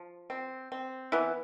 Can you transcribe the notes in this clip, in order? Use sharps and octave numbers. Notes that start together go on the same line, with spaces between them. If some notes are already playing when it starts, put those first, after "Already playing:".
Already playing: F3
C4
C4
E3 B3 E4